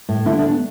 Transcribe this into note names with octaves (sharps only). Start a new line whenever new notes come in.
A2
D3 E4
D4
A3
B3